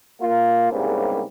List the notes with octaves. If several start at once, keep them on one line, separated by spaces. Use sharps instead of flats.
A#3 F4
C2 G#2 C#3 G3 A#3 B3